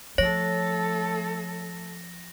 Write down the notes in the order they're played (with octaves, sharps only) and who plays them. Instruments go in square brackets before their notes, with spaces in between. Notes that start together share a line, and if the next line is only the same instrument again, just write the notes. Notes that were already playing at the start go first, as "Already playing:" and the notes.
[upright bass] F3 [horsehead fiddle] A3 A4 [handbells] C#5 [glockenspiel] A#6